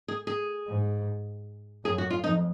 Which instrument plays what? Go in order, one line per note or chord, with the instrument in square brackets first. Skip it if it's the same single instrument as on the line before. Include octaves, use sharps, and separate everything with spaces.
[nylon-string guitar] G#4
G#4
[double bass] G#2
[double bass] F#2 [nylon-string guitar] G#4
[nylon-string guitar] F#4
F4
[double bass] F2 [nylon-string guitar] D#4